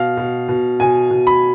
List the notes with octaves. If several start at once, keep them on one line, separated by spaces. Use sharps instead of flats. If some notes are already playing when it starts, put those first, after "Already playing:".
Already playing: B2 F5
B2
B2
B2 G#5
B2
B5